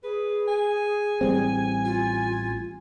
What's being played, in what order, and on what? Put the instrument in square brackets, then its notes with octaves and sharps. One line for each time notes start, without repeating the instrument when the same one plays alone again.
[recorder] G#4 [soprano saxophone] B4
[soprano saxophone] G#5
[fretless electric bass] A1 G3 C4
[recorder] F4